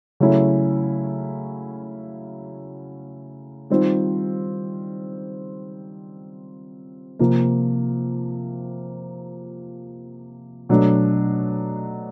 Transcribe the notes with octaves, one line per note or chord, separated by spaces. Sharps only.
C#3 F#3 A3 C#4 E4
D#3 G3 C4 F4
C3 F3 A#3
B2 F#3 A3 D4